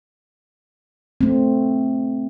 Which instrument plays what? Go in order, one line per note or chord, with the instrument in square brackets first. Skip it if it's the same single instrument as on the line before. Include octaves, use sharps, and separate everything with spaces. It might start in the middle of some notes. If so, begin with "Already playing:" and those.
[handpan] A3 C4